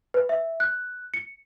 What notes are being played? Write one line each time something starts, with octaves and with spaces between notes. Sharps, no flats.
B4
E5
F#6
C#7